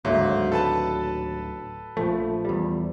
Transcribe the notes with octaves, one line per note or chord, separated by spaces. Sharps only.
D1 D#2 G#2 D3 F#3 E5
A4 B4 A5
A#1 F3 A3
E2 G3